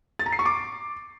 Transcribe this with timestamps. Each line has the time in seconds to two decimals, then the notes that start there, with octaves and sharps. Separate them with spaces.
0.19 A6
0.26 A#5
0.32 C7
0.39 C#6
0.46 D6